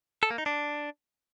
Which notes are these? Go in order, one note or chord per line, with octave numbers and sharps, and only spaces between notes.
A4
A#3
D#4
D4